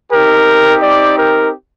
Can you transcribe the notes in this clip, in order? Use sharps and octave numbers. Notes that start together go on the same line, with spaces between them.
C4 D#4 G4 A#4
D5
A#4